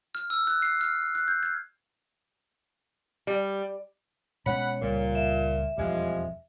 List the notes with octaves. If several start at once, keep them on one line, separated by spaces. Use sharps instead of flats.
F6
E6
F#6
C7
F6
F#6
G6
G#6
G3
B2 G#3 C#4 C#5 F#5 B5
C#2 A#2 G3 A#3
E5
E1 F2 F3 G3 G#3